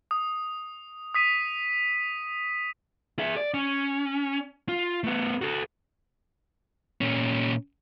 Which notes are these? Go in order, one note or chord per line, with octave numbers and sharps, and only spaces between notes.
D#6
D#6 B6 D#7
G#4 E5
D5
C#4
F4
A3 B3
F#4 A4
A#2 C#4